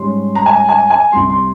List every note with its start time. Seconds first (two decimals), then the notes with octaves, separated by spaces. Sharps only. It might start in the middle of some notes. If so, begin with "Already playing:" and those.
Already playing: G#2 G3 C#4 C6
0.35 A#5
0.46 G#5
0.69 G#5
0.90 G#5
1.12 C2 C3 G3 C6
1.30 C6